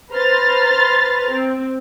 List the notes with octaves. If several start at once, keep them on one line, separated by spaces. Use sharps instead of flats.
B4 C5 A#5 C6 F6 A6
C4